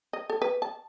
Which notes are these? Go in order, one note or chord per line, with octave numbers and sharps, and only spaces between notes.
D#5
A4
B4
A5